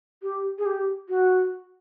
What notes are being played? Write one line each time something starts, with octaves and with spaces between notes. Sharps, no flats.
G4
G#4
G4
F#4